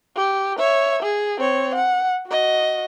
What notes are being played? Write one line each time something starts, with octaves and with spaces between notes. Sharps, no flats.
G4
C#5 E5
G#4
C4 C#5
F#5
F#4 D#5